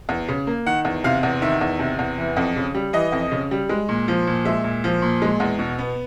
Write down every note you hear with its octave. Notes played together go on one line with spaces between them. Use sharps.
E2
C#3
A#3
D#3 F#5
E2
C3 F5
E2
D#3 E5
E2
C3
E2
E3
F2
C#3
G3
E3 D#5
F2
C#3
G3
G#3
A#2
F3
A#2
G#3 E5
A#2
F3
A#2
G#3
E2
B2
B3